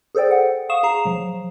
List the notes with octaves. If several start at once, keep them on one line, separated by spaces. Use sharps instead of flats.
G#4 A4 C5 D5 G5
F#5
F5 C#6 D#6 E7
G#4 A#5 C7
F3 F#3